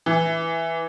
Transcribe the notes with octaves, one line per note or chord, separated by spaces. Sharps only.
E3